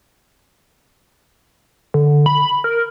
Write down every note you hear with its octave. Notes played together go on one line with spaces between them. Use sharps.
D3
B5
A#4